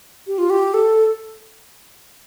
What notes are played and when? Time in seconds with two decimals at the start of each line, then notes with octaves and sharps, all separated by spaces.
0.27 G4
0.38 F4
0.50 G4
0.74 A4